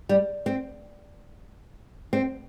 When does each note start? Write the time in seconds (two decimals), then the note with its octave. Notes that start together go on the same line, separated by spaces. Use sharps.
0.09 G3
0.46 C4
2.13 C4